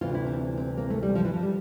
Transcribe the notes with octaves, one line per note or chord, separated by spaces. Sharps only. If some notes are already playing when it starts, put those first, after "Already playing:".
D2 C3 E3 F4
E4
C4
C4
A#3
A3
G3
F3
E3
F3
G3